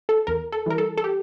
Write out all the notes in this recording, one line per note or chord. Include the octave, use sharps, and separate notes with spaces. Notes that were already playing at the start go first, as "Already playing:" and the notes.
A4
E2 A#4
A4
E3 G3 A#4
A4
A4
G4